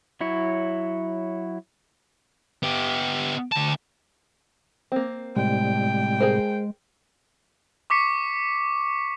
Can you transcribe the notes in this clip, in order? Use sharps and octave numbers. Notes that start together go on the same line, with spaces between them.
F#3 E4 C#5
B3 G4
D2 A5
A#3 C4
A2 C3 G3 G#3 G5
G#4 A#4 C5
C#6 D6 B6 C#7